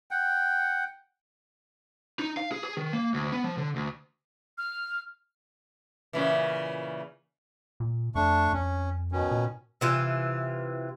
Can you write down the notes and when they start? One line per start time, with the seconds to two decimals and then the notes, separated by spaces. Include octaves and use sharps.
0.11 F#5 G5
2.19 D#4
2.37 F5
2.52 G#4
2.64 G#4
2.77 D#3
2.93 A#3
3.14 D2
3.32 B3
3.44 F3
3.58 D3
3.76 D2
4.58 F6
6.13 A#2 C#3 E3
7.80 A#2
8.15 F2 A3 D4 C#6
8.53 F2 C#4
9.12 B2 D#3 C#4
9.31 A#2
9.81 C3 E3 F4